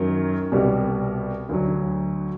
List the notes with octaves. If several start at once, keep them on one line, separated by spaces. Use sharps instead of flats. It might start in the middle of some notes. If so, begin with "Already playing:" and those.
Already playing: F#2 D#3 F#3
C2 B2 G3 B3
D2 D3 F#3